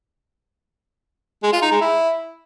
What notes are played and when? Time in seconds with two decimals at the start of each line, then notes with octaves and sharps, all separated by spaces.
1.43 G#3
1.53 F4
1.62 D#4
1.72 G#3
1.81 E4